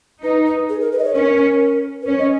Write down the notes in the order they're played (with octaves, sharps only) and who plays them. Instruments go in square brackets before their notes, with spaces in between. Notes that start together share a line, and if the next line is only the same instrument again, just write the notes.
[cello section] D#4 [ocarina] B4
[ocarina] B4
G#4
A#4
B4
D#5
C#5
[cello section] C#4 [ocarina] A#4
[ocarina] B4
[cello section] C#4 [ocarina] C#5
[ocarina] D#5